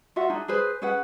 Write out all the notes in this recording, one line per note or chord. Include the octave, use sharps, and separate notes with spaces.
F4 F#4 E5 F#5
D4 D#4 G#4
G#4 B4 C5
C#4 G#4 B4 F#5